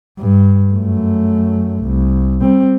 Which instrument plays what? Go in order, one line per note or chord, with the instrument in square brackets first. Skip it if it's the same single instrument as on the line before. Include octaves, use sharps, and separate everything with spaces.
[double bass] G2
F#2 A3
C2
G3 C4